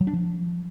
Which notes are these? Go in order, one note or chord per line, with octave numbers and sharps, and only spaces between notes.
F#3
D4
F3